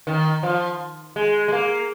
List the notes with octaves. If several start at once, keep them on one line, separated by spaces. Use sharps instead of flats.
D#3
F3
G#3
G#3
A#3